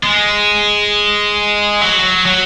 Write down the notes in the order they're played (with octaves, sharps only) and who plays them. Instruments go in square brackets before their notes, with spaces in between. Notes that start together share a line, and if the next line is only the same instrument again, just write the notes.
[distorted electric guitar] G#3
F#3
F#3